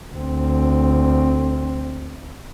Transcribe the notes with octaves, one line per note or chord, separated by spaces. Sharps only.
D2 C4